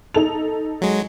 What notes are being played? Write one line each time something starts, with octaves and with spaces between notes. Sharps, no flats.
D#4 A4 F7
F#3 G#3